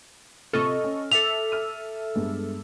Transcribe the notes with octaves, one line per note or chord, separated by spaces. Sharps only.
C3 F4 A4 D#5 C#6 F6
C#4
A4 E5 D6 E6 B6 F7
F6 D#7
G2 G#3 B3